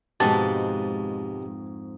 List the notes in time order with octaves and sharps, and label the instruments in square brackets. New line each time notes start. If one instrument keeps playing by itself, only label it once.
[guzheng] F2 G#2 [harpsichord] B2 G#3 [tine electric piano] G4 [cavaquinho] A5